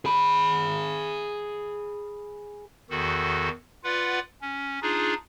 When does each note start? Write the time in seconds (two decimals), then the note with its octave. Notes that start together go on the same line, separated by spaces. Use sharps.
0.05 G#4 B5
2.90 E2 D#3 F#4 A4
3.84 F4 B4 D5 F#5
4.41 C#4
4.82 D4 D#4 F4 G#4